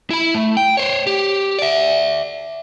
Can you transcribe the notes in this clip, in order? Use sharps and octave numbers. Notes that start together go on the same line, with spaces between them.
E4 B5
A3
G5
C5 C#5
G4
D5 E5